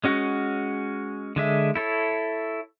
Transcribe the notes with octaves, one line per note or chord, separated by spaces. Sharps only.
G#3 C#4 F#4
D3 G#3 E5
E4 A4 C#5